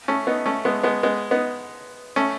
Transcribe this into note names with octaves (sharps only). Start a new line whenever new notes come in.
A3 C#4
B3 D#4
A3 C#4
G#3 B3
G#3 B3
G#3 B3
B3 D#4
A3 C#4